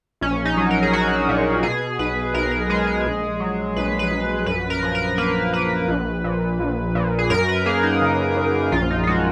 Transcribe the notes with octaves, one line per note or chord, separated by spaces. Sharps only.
A#1 C#4
D#4
F#3
A#4
G#4
F#3 F#4
A#2
B2 G#4
B1 B4
B1 A#4
A#4
G#3 G#4
G#4
A#1
F#3
A#1 B4
B4
A#1
F#2 B4
A#4
F3
A#4
A#3 B4
A#3 B4
A#1
A#2
A#1
A#2
G#4
F#2 A#4
B4
A#3 G#4
D#4
C#3
F#2
A#1 F4
D#4
F4
G#3 F#4